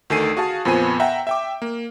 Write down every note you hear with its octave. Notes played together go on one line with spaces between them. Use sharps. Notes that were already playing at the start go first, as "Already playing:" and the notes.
D2 D#3 A4 G#5 C7 D#7
F#4 G#4 F5 A5
F2 A#2 B3 C5 G#5 D#7
E5 F#5 G5 A#5
E5 G5 D6
A#3